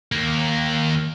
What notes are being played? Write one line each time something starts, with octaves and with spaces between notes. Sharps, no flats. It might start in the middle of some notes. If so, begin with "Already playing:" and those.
D#2 A#3